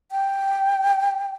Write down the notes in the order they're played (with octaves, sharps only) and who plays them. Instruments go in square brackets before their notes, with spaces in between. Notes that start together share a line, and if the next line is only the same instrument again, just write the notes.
[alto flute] G5